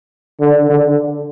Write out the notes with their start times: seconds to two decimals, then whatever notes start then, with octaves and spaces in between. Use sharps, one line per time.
0.40 D3
0.68 D3